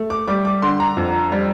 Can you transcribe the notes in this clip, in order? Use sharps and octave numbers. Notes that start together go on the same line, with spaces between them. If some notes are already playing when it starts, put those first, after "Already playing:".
Already playing: A3
D6
G3 D6
D6
D3 C6
A#5
F2
G3